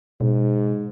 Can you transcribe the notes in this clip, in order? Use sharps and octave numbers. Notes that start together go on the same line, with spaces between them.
G#2 B2